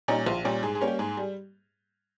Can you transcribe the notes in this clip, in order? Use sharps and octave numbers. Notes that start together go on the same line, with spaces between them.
A#2 G3 C#4 D#4
A#1 F4
A#2 G3 C#4
G#2 G#4
G#4
G3 A#3 C#4
G4
G#2 G#4
G3